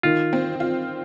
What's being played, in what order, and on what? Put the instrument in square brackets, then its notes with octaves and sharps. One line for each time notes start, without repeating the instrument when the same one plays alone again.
[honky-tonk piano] D#3 [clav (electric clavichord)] F4
[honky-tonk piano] C4
F4